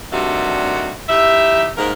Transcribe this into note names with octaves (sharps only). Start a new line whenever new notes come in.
C3 D#3 G3 A3 D4 F#4
D#4 E4 G4 E5
D#2 G#2 A#3 A#4